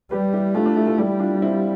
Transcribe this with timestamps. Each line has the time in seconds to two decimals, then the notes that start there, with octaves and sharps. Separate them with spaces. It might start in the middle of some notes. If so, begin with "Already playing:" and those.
0.11 G3 G4 B4
0.34 E4 G4
0.54 A3 D4 F4
0.65 D4 F4
0.76 E4 G4
0.87 F4 A4
0.98 G3 E4 G4
1.20 D4 F4
1.42 C4 E4